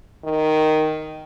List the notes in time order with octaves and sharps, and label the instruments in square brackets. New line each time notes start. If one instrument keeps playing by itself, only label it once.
[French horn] D#3